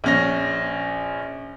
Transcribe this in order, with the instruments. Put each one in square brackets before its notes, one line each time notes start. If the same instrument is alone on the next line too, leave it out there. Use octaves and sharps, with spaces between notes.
[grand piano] A#1 C#4 A#6